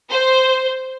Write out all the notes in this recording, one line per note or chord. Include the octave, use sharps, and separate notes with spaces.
C5